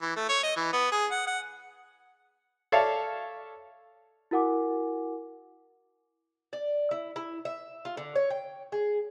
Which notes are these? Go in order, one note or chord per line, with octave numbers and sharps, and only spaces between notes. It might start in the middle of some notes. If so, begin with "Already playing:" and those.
E3
A3
C#5
D#5
E3
B3
G#4
F#5
F#5
A4 C#5 D5 E5 F5 A5
E4 F#4 A#4 F#5 G#5 D6
D5
E4
E4
E5
F4
D3
C#5
G5
G#4